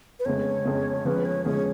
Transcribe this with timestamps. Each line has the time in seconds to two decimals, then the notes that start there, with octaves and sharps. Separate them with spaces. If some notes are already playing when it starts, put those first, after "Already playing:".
0.20 B4
0.25 F2 C#3 G#3 C#5
0.65 F2 C#3 G#3
1.05 F3 G#3 C#4 G#4 B4
1.25 C#5
1.45 F3 G#3 C#4 G#4 C#5